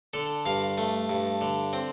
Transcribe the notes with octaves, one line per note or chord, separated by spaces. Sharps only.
D3 A4
G2 F5
A3
G2
D3
C4